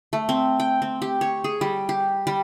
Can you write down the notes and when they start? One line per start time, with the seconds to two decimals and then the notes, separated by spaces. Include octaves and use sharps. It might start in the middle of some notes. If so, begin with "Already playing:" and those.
0.13 A3
0.29 C4
0.60 G5
0.82 C4
1.02 G4
1.21 C#5
1.44 G#4
1.61 G3
1.89 G4
2.27 G3